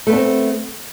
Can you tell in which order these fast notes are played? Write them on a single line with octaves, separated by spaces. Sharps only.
A3 B3 D4 C4